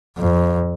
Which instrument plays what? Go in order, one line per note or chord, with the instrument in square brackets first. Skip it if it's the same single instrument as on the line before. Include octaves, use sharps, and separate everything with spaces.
[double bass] F2